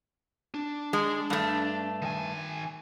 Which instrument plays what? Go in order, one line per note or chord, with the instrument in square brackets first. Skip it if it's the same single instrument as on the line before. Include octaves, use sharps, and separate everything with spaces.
[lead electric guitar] D4
[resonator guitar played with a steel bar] G#3
G2 A3
[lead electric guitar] D#3 G#5